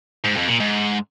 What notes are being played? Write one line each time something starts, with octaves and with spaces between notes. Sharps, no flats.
G#2
F2
A#2
G#2